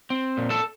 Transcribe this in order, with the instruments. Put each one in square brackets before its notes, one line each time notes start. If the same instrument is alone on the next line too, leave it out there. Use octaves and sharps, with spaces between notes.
[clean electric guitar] C4
A#2
A4 A5